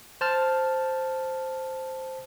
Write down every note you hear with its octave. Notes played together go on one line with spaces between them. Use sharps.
C5 A5 F6